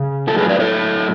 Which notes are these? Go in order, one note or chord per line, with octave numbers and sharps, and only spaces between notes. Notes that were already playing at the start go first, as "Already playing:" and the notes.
Already playing: C#3
A2 F#3 A3 F#4 A4
G#4 B4
B4 D5
A4 C#5